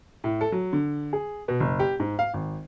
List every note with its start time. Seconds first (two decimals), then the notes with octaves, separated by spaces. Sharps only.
0.24 A2
0.41 A4
0.52 F#3
0.73 D3
1.13 G#4
1.48 B2
1.60 F#1
1.79 G4
2.00 G#2
2.19 F5
2.34 G#1